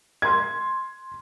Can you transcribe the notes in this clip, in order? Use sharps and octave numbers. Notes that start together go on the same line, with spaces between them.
C6 G#6